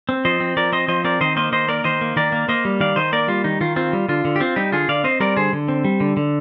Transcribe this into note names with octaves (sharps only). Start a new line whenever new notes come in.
C4
F3 C5 D#5
C4
F3 A#4 D5
C4 C5 D#5
F3 C5 D#5
C4 A#4 D5
D#3 C5 D#5
A#3 C5 D#5
D#3 C5 D#5
A#3 A#4 D5
D#3 C5 D#5
A#3
D#3 A#4 D5
A#3
A#3 C5 D#5
G3
D#3 D5 F5
D#3 C5 D#5
A#3 A#4 D5
G3 F4
D#3 D#4
D#3 F4
C4 F4
G3
D3 F4
D3
G4
C4 F4
G3 D#4 G4
D3 F4 G#4
D3 D5 F5
C4 C5 D#5
G3 A#4 D5
D3 G#4 C5
D3
C4
G3
D3
D3